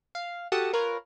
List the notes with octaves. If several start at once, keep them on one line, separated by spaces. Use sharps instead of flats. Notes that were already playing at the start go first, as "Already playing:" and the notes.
F5
F#4 G4 A4 F#5 A5 D#6
F4 A#4 B4 C#5